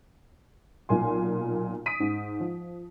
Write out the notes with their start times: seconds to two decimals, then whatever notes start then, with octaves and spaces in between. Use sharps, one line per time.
0.89 B1 A#2 G#5 C6
1.86 D#6 B6 D7 D#7
2.00 G#2
2.40 F3